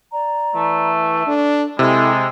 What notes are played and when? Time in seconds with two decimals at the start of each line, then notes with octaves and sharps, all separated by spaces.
0.12 D5 A#5
0.55 E3 A3
1.27 D4 A4
1.79 C3 G#3 E4 A4 G5 B5